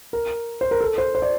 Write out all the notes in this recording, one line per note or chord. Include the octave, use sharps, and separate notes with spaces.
A#4
C5
A#4
A4
C5
C5
D5